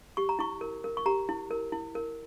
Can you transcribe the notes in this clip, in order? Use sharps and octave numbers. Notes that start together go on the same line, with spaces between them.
G4 C#6
A#5
E4 C#6
A#4
A#4
C#6
G4 A#5
E4
A#4
E4
A#4